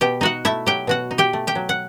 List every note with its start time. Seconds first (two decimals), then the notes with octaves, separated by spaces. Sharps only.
0.01 B2 G4 G5
0.21 D#4 F#4 F#5
0.45 A3 E4 E5
0.66 F#3 G4 G5
0.87 B2 F#4 F#5
1.11 D#4
1.18 G4 G5
1.33 A3
1.47 G4 G5
1.55 F#3
1.69 F#5